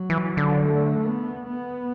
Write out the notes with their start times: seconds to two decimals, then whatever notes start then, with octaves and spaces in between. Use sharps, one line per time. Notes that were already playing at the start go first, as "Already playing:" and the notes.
Already playing: F#3
0.10 E3
0.37 D3
0.64 A3
1.06 B3
1.47 B3